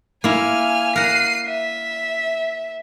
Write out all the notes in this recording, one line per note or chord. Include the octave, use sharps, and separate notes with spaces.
A#3 E4 G#5 F6
A#4 F#5 C7 D#7
E5